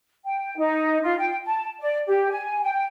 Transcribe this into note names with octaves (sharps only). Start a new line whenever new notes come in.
G5
D#4
F4
G5
A5
D5
G4
G#5
G5